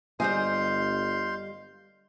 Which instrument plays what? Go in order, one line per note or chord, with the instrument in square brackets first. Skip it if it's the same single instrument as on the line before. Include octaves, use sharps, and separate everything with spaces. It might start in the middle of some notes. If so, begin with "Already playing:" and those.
[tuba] G1 [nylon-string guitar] G3 D#5 [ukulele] C5 G#5 [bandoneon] F5 C6 G6